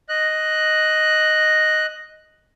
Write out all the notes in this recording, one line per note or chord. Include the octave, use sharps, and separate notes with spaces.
D#5 F#6